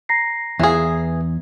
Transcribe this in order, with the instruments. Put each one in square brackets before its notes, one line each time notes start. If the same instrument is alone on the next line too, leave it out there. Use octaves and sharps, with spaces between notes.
[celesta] A#5 A#6 C7
[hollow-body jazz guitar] E2 F5 [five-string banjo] E3 G#4